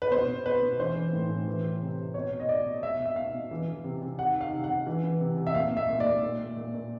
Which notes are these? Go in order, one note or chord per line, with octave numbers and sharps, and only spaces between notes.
B4
B2 C5
B2
B2 B4
B2
E3 C5
E3
A2
A2
E3
E3
C3
C3
B2 C#5
B2
D#5
B2 D5
B2
B2 E5
B2
E5
B2 F5
B2
E3
E3
C3
C3
D#3 F#5
D#3
F5
C3
F#5
C3
E3
E3
C3
C3
E5
A#2 F5
A#2
E5
A#2
A#2 D5
A#2
A#2
A#2
A#2